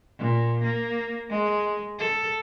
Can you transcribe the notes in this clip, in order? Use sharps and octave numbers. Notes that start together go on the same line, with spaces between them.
A#2
A#3
G#3
A4